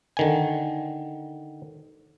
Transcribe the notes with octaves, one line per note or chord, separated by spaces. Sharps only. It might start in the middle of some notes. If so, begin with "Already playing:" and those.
D3 D#3 G#5